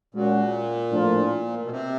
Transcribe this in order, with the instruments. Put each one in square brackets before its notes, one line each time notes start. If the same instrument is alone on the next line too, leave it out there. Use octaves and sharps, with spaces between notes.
[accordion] A#2 [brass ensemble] G#3 C#4 F#4
[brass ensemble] A2 F3 A#3 D4 F4
[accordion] B2
C3